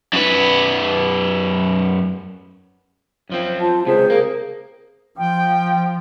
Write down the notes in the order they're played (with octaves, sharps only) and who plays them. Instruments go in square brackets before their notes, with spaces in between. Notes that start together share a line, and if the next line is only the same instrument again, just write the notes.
[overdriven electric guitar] F#2 B4
[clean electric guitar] F#2 F3 C4
[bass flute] F4 [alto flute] A5
[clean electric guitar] C#2 C3 [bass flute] G#4 [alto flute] C5
[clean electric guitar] A#3 [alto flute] A#4
[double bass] F3 [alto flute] G5